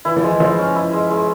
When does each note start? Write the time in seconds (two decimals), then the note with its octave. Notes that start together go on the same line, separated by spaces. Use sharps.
0.05 E3 E4
0.17 F3
0.24 G#3
0.29 E3
0.40 F3 G#3
0.59 C#4
0.76 E4
0.93 G#3
1.10 G#3